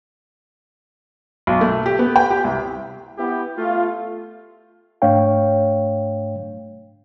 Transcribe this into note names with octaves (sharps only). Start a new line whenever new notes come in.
B1
A3
G4
B3
G5
G4
C2
B3 E4 G4
A3 F4
G#2 A3 D4 C#5 F5 G5